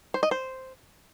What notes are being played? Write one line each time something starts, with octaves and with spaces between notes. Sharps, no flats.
C5
D#5
C5